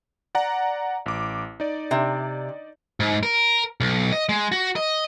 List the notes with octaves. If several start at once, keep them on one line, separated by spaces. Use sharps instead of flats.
D5 F#5 A#5
A1 D6
D#4 D5
C3
G#2
A#4
B1
D#5
G#3
F#4
D#5